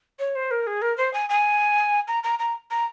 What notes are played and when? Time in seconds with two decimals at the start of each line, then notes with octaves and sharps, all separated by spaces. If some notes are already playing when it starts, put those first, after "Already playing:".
0.19 C#5
0.36 C5
0.51 A#4
0.67 G#4
0.82 A#4
0.98 C5
1.14 G#5
1.30 G#5
2.08 A#5
2.24 A#5
2.39 A#5
2.71 A#5